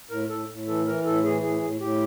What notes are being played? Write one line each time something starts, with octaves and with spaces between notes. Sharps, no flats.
A2 A#4
A2 A4
A2
E3 A4
E3 A#4
A2 A4
E3 G#4
A2 G#4
A2
A2 G4